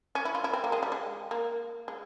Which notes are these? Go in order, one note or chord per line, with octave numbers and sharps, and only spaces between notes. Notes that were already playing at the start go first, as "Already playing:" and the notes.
C#4
E4
F4
E4
C4
A#3
G#3
G3
G#3
A#3
G#3